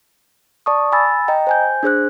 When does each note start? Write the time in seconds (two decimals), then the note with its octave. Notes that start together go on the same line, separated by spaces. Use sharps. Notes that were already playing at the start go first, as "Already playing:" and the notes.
0.66 D5 A5 C#6 D#6
0.92 G#5 B5 E6 A6
1.28 D#5 G5 A#5
1.47 C5 G#5 G6
1.83 D4 G#4 C5 F#6